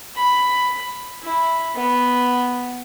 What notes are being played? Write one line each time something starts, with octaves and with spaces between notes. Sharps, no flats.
B5
E4
B3